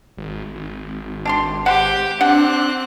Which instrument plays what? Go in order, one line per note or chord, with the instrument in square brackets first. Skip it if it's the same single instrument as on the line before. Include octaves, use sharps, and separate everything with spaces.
[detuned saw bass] G#1
G#1
[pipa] D4 G4 C6
[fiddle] G4 [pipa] C5 F#5
[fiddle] C4 F#6 [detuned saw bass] D4 [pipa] F#5